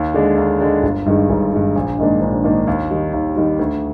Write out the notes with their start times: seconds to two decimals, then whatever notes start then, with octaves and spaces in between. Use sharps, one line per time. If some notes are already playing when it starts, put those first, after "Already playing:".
Already playing: D#2
0.14 D3 G#3 D4
0.37 D#2
0.61 D3 G#3 D4
0.83 G1
1.06 G2 D#3 G#3
1.30 G1
1.53 G2 D#3 G#3
1.75 A#1
1.98 G#2 D#3 A#3 D4
2.21 A#1
2.44 G#2 D#3 A#3 D4
2.67 D#2
2.91 D#3 G3
3.13 D#2
3.36 D#3 G3
3.59 D2